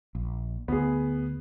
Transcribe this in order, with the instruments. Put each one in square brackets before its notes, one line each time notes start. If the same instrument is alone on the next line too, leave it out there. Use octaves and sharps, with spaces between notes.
[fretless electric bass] A#1
[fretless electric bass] D2 [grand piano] B3 G#4